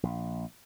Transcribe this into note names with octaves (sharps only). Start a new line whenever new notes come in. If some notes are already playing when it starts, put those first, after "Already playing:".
A#1